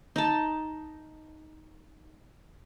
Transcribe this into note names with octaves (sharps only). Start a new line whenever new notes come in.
D#4 A5